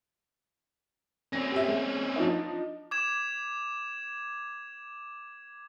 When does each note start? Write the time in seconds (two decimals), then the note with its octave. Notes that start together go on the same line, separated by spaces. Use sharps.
1.33 C4 C#4 A#6
1.52 G4 E5
1.68 G#3
2.16 F3 D4 D#4
2.91 D6 G#6 E7